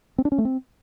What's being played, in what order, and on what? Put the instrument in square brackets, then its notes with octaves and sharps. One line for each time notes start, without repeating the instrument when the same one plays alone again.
[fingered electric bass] C4
D4
C#4
A3
C4